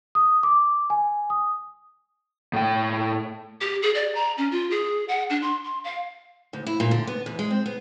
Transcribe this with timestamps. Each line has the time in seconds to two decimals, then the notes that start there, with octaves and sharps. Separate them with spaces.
0.15 D#6
0.43 D6
0.90 G#5
1.30 D#6
2.53 A2 G5
3.61 G4
3.83 G#4
3.95 D5
4.15 A#5
4.38 C#4
4.51 F4
4.71 G#4
5.08 F#5
5.30 D4
5.42 C6
5.64 C6
5.84 F5
6.53 D2
6.67 E4
6.80 A#2
6.91 D3
7.07 B3
7.26 E2
7.39 G#3
7.50 C4
7.66 B3